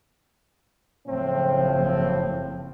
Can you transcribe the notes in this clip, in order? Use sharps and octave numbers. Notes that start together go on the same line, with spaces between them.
F#1 A2 F3 C4